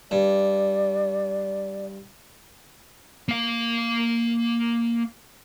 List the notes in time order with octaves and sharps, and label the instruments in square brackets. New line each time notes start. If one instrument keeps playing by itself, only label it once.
[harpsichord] G2 [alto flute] D5
[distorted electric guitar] A#3 F5